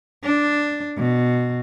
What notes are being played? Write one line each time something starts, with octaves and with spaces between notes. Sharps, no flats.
D4
B2